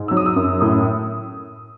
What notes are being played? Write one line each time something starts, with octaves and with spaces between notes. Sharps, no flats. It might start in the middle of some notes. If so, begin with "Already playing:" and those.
Already playing: G#2
F#3 E6
D#6
E6
F#2
A2 D#6